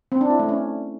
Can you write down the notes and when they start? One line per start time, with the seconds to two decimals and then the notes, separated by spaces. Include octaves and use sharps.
0.12 C4
0.21 D4
0.30 E4
0.39 A3
0.49 C#4